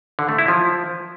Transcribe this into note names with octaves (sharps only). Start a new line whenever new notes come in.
D3
A3
E4
F3